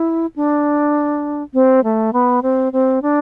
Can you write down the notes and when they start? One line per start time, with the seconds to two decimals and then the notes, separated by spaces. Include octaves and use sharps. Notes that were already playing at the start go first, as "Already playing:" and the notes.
Already playing: E4
0.36 D4
1.54 C4
1.84 A3
2.13 B3
2.43 C4
2.73 C4
3.02 D4